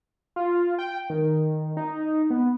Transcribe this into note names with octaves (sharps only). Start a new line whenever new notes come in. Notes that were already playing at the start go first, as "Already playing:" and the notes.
F4
G5
D#3
D#4
B3